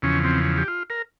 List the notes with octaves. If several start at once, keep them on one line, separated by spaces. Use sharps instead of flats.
E2 C#3 F3 C#4
C4
G4
F4
A#4